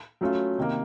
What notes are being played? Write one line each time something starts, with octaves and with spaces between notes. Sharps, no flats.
F#3 A3 C#4 F4
C3 D#3 A#3